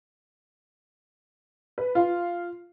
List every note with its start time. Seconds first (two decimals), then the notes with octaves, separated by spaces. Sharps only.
1.78 B4
1.95 F4